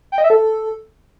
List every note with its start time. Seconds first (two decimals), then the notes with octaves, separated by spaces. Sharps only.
0.12 G5
0.18 D#5
0.24 E5
0.30 A4